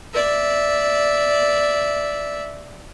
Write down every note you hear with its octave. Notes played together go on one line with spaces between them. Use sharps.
D5 E5